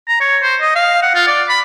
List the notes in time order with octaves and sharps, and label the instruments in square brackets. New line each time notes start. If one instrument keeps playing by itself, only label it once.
[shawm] A#5
C#5
C5
D#5
F5
F#5
F4
D5
B5